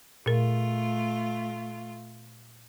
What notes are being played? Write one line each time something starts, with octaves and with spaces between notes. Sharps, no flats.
A#2 A3 F4 A#4